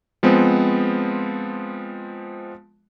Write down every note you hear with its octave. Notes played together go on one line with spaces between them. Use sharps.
F3 G#3 B3 C4